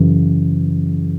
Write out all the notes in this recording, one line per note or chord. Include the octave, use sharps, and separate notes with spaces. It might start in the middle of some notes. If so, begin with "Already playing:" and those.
Already playing: F#2 C#3 E3